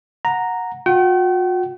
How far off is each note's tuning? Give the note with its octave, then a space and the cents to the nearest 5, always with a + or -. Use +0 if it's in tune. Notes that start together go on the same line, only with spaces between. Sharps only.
F#5 -15 A#5 +0
F#4 -45 G5 -45